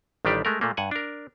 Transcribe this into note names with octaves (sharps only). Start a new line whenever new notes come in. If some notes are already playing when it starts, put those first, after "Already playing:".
A1 D#3 G3 D4 G4 D5
G#3 A3 A#4
A#2 A3 A#3
G2 F#5 G#5
D4 A#4